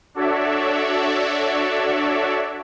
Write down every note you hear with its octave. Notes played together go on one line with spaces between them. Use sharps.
D4 F#4 A4 C#5 D5 E5